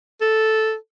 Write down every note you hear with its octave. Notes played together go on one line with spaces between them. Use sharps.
A4